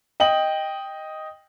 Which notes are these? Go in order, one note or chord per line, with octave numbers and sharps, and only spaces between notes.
D#5 G5 F#7